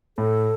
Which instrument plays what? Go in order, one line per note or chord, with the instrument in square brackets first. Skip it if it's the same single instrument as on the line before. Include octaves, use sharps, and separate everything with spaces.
[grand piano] A2 [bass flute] A4